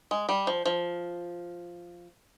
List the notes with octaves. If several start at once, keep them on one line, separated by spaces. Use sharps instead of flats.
G#3
G3
F3
F3